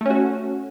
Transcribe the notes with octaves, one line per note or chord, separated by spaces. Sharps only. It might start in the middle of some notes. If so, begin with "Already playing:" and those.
A3 C#4 F#4